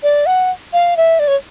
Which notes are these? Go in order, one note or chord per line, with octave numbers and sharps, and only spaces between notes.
D5
F#5
F5
E5
D5
C#5